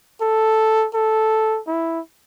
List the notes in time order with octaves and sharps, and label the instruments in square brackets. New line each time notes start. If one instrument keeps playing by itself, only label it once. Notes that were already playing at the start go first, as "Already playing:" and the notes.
[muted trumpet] A4
A4
E4